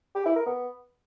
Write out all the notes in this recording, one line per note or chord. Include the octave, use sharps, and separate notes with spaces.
G4
E4
A#4
B3